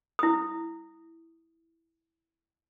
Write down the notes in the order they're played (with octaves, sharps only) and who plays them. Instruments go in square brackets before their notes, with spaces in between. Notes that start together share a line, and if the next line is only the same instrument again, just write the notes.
[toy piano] E4 D#6